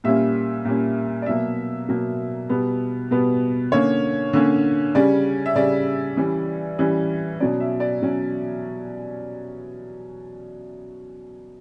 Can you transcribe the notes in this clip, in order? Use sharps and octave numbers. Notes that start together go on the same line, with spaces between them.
A#2 G3 A#3 C#4 E5
A#2 G3 A#3 C#4
D5
B2 F#3 A#3 E5
B2 F#3 A#3
B2 G3 B3
B2 G3 B3
D3 A#3 C#4 C#5
D3 A#3 C#4
C#3 G3 C#4 D5
E5
C#3 G3 C#4 D5
E3 G3 C#4
E3 G3 C#4
B2 F#3 C#4 D5
E5
D5
B2 F#3 C#4